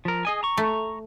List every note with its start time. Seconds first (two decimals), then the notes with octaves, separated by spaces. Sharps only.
0.05 F3 A#4
0.25 G#4 D#5 G#5
0.43 A#5 C#6
0.57 A3